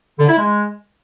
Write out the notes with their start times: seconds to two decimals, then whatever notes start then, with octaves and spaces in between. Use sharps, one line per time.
0.19 D3
0.28 E4
0.38 G#3